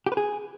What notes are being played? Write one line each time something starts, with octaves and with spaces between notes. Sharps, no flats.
G4
B4
G#4